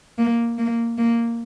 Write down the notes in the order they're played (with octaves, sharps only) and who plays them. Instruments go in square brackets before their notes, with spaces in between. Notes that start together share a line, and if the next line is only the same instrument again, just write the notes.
[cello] A#3
A#3
A#3